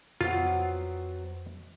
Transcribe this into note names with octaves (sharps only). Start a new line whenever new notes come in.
F2 F#3 B3 C4 F4